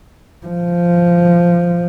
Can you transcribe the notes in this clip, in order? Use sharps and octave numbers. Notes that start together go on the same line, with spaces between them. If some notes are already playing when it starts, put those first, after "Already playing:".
F3